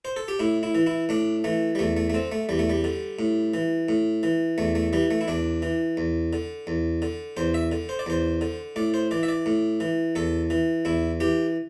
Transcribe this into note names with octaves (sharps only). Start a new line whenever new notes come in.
C5
A4
G4
A2 E4
E4
E3
E4
A2 D4
E3 A3
G3
E2 A3
A3
A3
D3 C4
A3
E2 G3
A3
G3
D3
A2
E3
A2
E3
E2 A3
A3
E3 G3
A3
E4
E2 D4
E3
E2
D3
E2
D3
E2 C5
E5
D3
C5
D5
E2 C5
D3
A2 D5
C5
E3 D5
E5
D5
A2
E3
E2 A4
E3
E2 E4
E3 G4